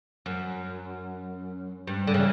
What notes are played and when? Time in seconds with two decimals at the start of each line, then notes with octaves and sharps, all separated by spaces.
0.26 F#2
1.87 G2
2.07 D3
2.14 C#3 E3